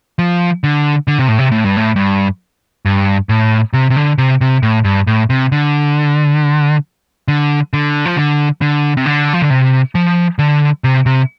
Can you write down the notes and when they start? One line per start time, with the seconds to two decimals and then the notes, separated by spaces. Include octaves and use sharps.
0.19 F3
0.64 D3
1.08 D3
1.19 C3
1.28 A2
1.38 C3
1.52 A2
1.64 G2
1.77 A2
1.96 G2
2.85 G2
3.29 A2
3.73 C3
3.90 C3
3.96 D3
4.18 C3
4.41 C3
4.63 A2
4.84 G2
5.07 A2
5.30 C3
5.52 D3
7.28 D3
7.73 D3
8.05 F3
8.17 D3
8.61 D3
8.97 C3
9.06 D3
9.33 F3
9.42 D3
9.50 C3
9.95 F3
10.39 D3
10.84 C3
11.06 C3